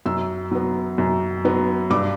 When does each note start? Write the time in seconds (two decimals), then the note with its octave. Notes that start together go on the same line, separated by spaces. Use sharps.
0.06 F#2 E6
0.51 F#3 B3
0.98 F#2
1.45 F#3 B3
1.90 G2 D6